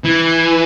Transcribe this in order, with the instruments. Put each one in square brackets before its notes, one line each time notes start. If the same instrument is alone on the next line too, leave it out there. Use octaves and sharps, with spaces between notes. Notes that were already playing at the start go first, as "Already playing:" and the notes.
[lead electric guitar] E3